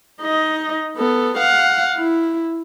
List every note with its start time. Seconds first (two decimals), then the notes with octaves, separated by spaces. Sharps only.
0.21 D#4 D#5
0.97 B3 A4
1.37 F5 F#5
1.95 E4